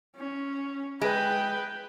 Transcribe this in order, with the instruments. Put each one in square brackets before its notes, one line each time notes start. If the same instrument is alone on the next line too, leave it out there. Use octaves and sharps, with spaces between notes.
[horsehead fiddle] C#4
[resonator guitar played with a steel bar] G#3 [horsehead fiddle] B4 G5